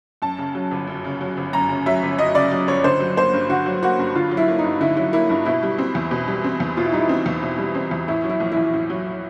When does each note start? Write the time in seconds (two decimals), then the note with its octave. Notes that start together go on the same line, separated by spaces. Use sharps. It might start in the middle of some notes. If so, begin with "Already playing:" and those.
0.22 F#2 A5
0.38 C#3
0.55 F#3
0.71 G1
0.87 F#2
1.04 C#3
1.21 F#3
1.37 G1
1.53 F#2 A#5
1.69 C#3
1.86 F#3 E5
2.03 G1
2.18 F#2 D#5
2.35 C#3 D5
2.51 F#3
2.68 G1 C#5
2.84 D3 C5
3.00 F#3
3.17 A#3 C5
3.33 G2
3.49 D3 F#4
3.66 F#3
3.83 A#3 F#4
3.99 G2
4.15 D3 F4
4.31 F#3
4.37 E4
4.48 A#3
4.58 D#4
4.64 G2
4.81 D3 E4
4.97 F#3 E4
5.13 A#3 E4
5.29 G2 E4
5.45 B2 E4
5.63 G3
5.79 C4
5.95 E2
6.11 B2
6.28 G3
6.44 C4
6.60 E2
6.77 B2 F4
6.84 E4
6.92 G3 D#4
6.99 E4
7.09 C4
7.26 E2
7.43 B2
7.58 G3
7.75 C4
7.91 E2
8.08 A2 E4
8.24 F#3
8.29 E4
8.40 A#1
8.52 E4
8.57 A#1
8.73 A2
8.90 F#3